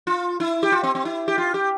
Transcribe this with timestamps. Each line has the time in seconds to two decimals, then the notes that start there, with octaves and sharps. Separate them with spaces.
0.07 F4
0.40 E4
0.63 G4
0.72 F4
0.83 C4
0.95 C4
1.05 E4
1.28 G4
1.38 F4
1.54 G4